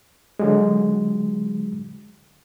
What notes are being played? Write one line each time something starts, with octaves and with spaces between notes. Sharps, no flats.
D3 F#3 G#3